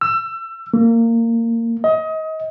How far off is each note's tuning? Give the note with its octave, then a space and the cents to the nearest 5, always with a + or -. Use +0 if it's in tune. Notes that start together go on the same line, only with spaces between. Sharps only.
E6 +25
A#3 -20
D#5 +25